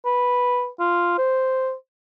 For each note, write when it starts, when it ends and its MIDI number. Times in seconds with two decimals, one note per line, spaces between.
0.05 0.68 71
0.79 1.13 65
1.18 1.73 72